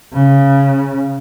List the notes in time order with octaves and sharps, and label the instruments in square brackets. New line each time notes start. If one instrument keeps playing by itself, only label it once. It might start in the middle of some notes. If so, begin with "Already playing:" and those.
[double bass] C#3